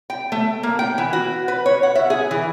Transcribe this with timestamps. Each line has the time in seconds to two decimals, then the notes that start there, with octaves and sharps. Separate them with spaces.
0.10 G5
0.32 A3
0.63 A#3
0.79 G5
0.98 E3
1.13 F#4
1.48 B4
1.66 C#5
1.83 F#5
1.95 E5
2.10 G#4
2.31 E3